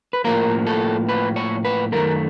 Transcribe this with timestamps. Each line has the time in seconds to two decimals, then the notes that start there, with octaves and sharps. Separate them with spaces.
0.13 B4
0.24 A2 F3 A#3 A#4
0.67 A4
1.09 B4
1.36 C#5
1.64 B4
1.92 F#2 D#3 F#3 A3 A#4